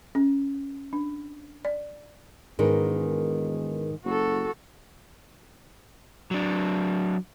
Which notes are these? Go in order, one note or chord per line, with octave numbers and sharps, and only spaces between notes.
C#4
D4
D5
E1 G#2 D#3 G#4 A#4 B4
F#1 F#4 A4
F#3 D4